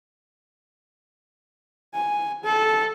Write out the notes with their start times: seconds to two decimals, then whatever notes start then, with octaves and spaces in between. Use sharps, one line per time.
1.94 G#5
2.44 A4